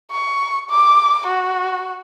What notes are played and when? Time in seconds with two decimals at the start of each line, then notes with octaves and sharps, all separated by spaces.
0.11 C#6
0.69 D6
1.27 F#4